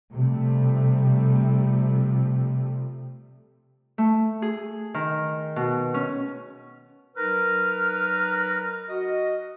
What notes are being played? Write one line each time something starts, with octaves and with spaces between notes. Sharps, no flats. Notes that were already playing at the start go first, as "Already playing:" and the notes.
C3 F3 G3 A3
A3
G#4
D#3
B2
C#4
F#3 D#4 A#4 B4 A#5 F6
F#4 D#5